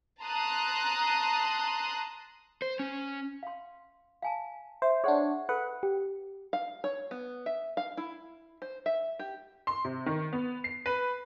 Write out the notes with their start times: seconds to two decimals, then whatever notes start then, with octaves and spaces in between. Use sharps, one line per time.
0.22 A5 A#5 C6 D#6 F#6
2.62 C5
2.79 C#4
3.43 F5 C6
4.22 F5 G#5 A5
4.82 C5 E5
5.04 D4 G#4 C5 C#5 F#5
5.49 A4 B4 F#5
5.83 G4
6.53 F5
6.84 C#5
7.11 B3
7.46 E5
7.77 F5
7.97 E4
8.62 C5
8.86 E5
9.19 G4
9.67 C6
9.85 C3
10.06 D#3
10.33 B3
10.64 C7
10.86 B4